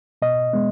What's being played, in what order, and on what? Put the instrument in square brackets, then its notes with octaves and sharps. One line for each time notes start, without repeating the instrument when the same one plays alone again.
[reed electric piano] B2 D#5
G#3 B3